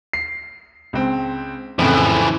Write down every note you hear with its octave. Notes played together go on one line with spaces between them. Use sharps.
C7
C#2 C4
F2 A2 C#3 E3 F3